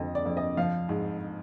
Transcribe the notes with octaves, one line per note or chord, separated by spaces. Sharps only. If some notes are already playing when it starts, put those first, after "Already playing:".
Already playing: F2 D3 F3 D#5
D5
F2
D#5
F3 F5
G#2